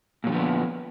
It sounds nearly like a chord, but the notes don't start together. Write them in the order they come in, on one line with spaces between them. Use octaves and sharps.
A#2 F#3 D3 F3 B3